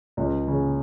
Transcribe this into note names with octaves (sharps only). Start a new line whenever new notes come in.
C#2
C#3